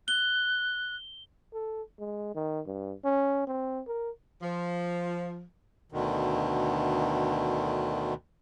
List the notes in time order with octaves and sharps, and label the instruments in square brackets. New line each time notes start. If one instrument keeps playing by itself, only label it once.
[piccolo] F#6 [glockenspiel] G7
[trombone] A4
G#3
D#3
G2
C#4
C4
A#4
[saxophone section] F3
[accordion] D2 B2 D3 D#3